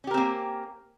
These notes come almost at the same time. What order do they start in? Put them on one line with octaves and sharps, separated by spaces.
C#4 G4 A#4 C4 A#3